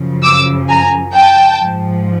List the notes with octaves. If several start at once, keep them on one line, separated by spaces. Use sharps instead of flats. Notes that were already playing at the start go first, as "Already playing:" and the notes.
Already playing: F#2 C#3 F3
D6 E6
G#5 A#5
G5 A5
G#2 F3